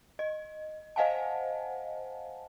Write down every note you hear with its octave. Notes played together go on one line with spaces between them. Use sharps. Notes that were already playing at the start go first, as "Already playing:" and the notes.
D#5
C5 D#5 F5 F#5 G#5 A5